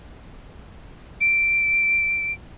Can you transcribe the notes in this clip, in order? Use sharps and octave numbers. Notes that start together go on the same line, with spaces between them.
D7